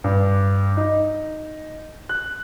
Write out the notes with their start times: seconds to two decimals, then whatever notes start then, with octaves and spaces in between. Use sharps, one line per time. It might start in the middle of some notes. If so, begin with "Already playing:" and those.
0.04 G2
0.77 D#4
2.09 F#6